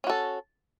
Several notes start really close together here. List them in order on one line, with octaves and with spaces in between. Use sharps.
C#4 F#4 A4